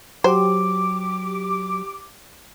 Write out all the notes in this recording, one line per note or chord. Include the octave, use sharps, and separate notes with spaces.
F#3 G4 C5 D6